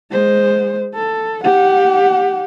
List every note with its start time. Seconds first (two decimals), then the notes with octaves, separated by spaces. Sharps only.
0.11 G#3 C5
0.95 A4
1.43 G4 F#5